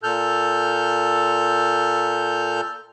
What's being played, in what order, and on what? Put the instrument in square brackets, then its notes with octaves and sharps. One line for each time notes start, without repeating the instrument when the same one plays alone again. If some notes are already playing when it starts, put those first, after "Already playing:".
[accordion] A#2 A4 F6 G6